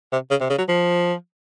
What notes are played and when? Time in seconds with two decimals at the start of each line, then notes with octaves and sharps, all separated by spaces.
0.12 C3
0.31 C#3
0.41 C3
0.50 C#3
0.58 F#3
0.69 F3